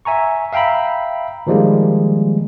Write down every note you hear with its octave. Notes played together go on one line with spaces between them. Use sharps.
E5 G#5 A#5 C#6
E5 F5 G5 A#5 B5
D#3 F3 G3 G#3 A#3